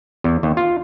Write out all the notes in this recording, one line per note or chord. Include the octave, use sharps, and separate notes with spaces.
E2
D#2
F4